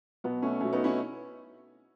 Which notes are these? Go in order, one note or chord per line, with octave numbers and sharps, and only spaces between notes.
B2 F#3 B3
A3 C#4
B2 F#3 A3 C#4
B3 D#4
C#4 E4